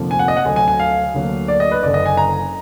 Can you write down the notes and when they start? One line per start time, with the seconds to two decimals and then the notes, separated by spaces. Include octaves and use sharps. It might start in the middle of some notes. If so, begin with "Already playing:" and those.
Already playing: F1 F2 D3 F3 A#3
0.11 G#5
0.19 F#5
0.28 D#5
0.37 F#5
0.45 D2 D3 F#3 G#5
0.56 G#5
0.68 G#5
0.80 F5
1.14 D2 D3 F#3 A#3
1.48 D5
1.60 D#5
1.71 B4
1.83 F#1 F#2 D3 D5
1.94 D#5
2.06 G#5
2.17 A#5